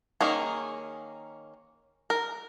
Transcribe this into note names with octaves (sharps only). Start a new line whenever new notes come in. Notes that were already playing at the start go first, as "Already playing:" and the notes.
D#3 A#3 C#4 G#4
A#4